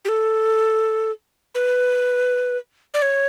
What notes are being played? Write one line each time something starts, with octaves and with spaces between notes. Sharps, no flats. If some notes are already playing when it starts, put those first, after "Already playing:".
G4
A4
B4
D5
C#5